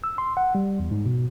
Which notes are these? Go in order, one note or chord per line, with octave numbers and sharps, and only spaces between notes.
E6
C6
F#5
G3
E2
G#2
B2